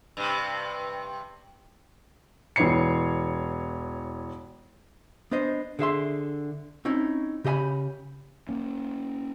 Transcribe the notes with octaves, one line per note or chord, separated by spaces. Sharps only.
G2 C3
E1 E3 B3 C#5 C7 C#7
B3 D4 C5 D#5
D3 G#4 E5 C6
C4 C#4 D#4 E4
C#3 G4 D#5 G#5 B5
A#3 C#4